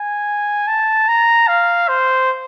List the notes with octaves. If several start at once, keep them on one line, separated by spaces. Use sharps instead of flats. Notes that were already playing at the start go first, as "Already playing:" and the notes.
Already playing: G#5
A5
A#5
F5
C5